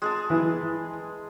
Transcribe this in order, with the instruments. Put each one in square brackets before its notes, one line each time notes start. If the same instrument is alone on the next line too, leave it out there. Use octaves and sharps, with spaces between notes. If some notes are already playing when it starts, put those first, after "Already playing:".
[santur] G#3 G#4 A5
[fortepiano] E3